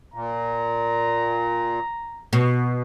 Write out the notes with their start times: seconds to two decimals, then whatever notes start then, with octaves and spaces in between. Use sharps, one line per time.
0.14 A#2 A#5
2.33 B2